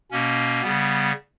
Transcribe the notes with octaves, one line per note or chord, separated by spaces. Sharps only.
B2 A#3 C#4
C#3 G3 B3